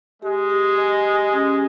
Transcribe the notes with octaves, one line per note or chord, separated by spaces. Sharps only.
G#3 G4
G4
D#5
G4
C#4